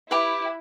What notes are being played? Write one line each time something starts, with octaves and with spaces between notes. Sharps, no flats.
E4 G4 B4 E5